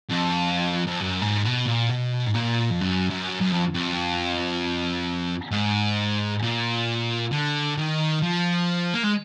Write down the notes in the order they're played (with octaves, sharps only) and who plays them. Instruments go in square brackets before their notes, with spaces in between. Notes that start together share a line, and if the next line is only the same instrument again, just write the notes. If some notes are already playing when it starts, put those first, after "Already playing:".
[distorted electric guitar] F2
F2
F#2
G#2
B2
A#2
B2
G#2
A#2
F2
F#2
F#2
F#2
F2
F2
G#2
A#2
D3
D#3
F3
A#3
G#3